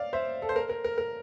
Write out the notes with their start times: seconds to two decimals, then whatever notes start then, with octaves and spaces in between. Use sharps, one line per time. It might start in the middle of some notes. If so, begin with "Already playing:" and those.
Already playing: D5 F5
0.13 C5 E5
0.42 A4
0.49 C5
0.56 A#4
0.69 A#4
0.84 A#4
0.98 A#4